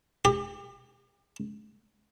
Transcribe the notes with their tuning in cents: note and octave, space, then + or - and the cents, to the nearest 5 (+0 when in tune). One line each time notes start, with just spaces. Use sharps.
G4 +35